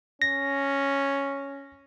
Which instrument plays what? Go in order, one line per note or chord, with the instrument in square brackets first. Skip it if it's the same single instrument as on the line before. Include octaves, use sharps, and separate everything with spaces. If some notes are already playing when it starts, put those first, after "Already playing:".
[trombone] C#4 [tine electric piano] A#6